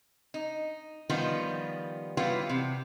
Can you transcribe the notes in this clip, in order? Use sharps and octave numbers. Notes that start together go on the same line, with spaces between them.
D#4
D#3 F3 G3 B3 F4
E3 F#3 G3 B3 F4
C3